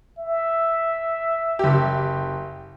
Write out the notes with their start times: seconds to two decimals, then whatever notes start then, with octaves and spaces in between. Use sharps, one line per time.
0.18 E5
1.59 F#1 G4